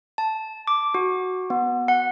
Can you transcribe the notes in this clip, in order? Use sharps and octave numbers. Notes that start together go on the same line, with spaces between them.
A5
D6
F#4
B3
F#5